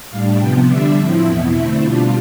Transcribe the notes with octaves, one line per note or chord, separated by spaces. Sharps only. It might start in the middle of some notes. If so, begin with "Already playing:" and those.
A2 G3 D4 F5
C3 F3 B3 G5
D3 G3 D4 E5
A2 F3 C4 E4
E2 B2 B3 E4 E5
D3 A3 C4 E4 E5
B2 G3 D4 F4